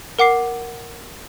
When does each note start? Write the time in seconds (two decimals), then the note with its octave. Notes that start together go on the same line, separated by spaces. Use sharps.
0.19 A#4 F#5 D6 C7